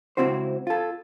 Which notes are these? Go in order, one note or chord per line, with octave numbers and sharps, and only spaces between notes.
C#2 F#2 C4 E4 F#4 C5
F4 A4